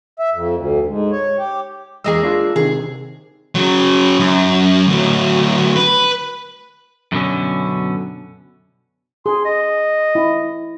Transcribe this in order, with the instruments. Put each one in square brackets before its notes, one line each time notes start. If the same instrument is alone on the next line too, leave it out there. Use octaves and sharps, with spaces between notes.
[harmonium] E5
F2
D2
G#2
C#5
G4
[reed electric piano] E2 D#5 E6 [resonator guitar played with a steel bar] G#3 A#3 G#4
[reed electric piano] D4 F4 E6
[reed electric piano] C3 D#3 [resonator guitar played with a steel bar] G#4
[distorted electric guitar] C#3 F#3
F#2
D2 F#3
B4
[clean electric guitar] F#2 B2 D3 C#4
[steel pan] G#4 [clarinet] C6
[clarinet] D#5
[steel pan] E4